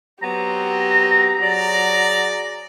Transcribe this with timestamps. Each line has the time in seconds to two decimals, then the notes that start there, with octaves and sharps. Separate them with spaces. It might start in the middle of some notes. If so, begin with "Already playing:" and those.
0.23 F#3 B3 C4 G4 A#5
1.43 F#3 G#4 D5